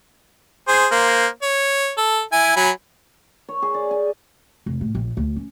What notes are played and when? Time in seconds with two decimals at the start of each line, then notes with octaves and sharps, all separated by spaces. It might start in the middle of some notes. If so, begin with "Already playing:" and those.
0.68 G#4 C5
0.91 A#3 C5
1.42 C#5
1.98 A4
2.33 E4 G#5
2.56 F#3 G#5 B5
3.49 C#5
3.62 G#4
3.74 D5
3.91 G#5
4.66 F1
4.81 A2
4.95 A#1
5.17 D2
5.36 C#4